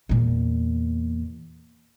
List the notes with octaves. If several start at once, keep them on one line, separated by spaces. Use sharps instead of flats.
E2 A#2